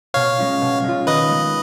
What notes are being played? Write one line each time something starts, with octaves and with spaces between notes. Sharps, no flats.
B2 C#5 F5
G#3 C#4 F4
B2
G#3 C#4 F4
D#3 B4 D#5
G#3 B3